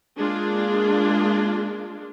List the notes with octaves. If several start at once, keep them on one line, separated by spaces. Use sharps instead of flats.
G#3 A#3 D4 F4